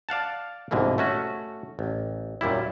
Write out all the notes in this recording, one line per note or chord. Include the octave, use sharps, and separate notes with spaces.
D5 F5 F#5 A5
C2 G#2 B2 D3 E3 A#3
A3 C#4 F#4
A1
F#2 A#2 G3 E4